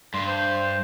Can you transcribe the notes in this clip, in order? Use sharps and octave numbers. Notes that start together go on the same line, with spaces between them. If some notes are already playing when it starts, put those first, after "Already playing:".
G2 C6
C5